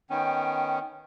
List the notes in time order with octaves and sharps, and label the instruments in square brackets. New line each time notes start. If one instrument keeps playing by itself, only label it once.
[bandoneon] D#3 B3 C#4 [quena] G5